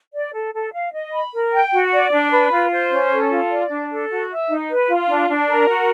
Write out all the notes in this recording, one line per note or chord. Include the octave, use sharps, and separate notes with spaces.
D5
A4
A4
F5
D#5
B5
A#4
G5
F#4
D5
D4
B4
F4
C5
C#4
A4
F4
D5
D4
A4
F#4
E5
D#4
B4
F4
D4
D4
A#4
F#4